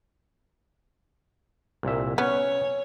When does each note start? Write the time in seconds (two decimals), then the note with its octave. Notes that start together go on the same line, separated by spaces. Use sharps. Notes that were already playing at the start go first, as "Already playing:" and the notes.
1.83 C2 A#2 E5
2.18 B3 C#4 C#5